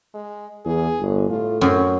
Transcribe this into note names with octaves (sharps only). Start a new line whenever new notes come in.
G#3
E2 G#4
G1
A2 F4
F#2 C4 G#4